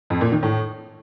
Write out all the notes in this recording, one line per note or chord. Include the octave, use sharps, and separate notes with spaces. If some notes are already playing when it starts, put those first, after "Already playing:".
F2
A#2
D#3
A2